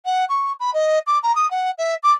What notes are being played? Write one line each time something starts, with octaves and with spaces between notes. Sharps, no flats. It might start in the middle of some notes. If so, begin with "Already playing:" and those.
F#5
C#6
B5
D#5
D6
A#5
D#6
F#5
E5
D6